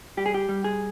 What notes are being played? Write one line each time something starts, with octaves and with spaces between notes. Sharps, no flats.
G3 G4
G#4
G4
G3
G#4